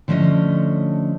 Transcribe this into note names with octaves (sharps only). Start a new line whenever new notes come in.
D3 F3 A3 C#4 D#5